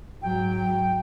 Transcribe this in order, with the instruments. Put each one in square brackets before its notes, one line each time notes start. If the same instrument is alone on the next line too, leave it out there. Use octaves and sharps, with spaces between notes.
[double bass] G#2 F#3 [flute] G5